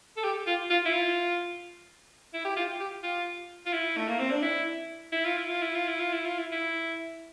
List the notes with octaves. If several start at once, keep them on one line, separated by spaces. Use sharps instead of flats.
A4
G4
F4
F4
E4
F4
E4
G4
F4
G4
F4
F4
E4
A3
A#3
C4
D4
E4
E4
F4
E4
F4
E4
F4
E4
F4
E4
F4
E4
E4